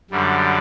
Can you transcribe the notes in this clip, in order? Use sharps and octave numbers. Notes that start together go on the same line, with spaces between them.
F#2 D3 G3